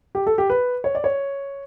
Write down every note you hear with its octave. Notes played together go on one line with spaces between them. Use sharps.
G4
A4
G4
B4
C#5
D5
C#5